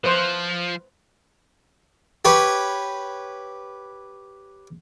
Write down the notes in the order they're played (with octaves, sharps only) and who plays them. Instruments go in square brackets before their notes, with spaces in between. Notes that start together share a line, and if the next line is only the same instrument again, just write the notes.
[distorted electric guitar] F3 [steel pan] B4 C5
[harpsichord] G4 B4 C#5